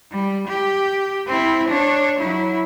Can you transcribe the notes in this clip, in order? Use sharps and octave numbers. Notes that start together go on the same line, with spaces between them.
G3
G4
C4 E4
D4 C#5
F#3 E4